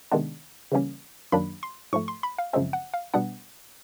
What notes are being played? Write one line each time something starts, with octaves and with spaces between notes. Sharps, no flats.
C3 D#3 G#3 B3 D4
C#3 E3 G3 A#3 C#4
F#2 D#3 F#3 A#3 D4 B5
C6
G#2 F3 A3 C#6
C6
B5
F5
F#2 C#3 F3 G#3 C4 E5
F#5
F5
B2 G3 B3 D4 F#5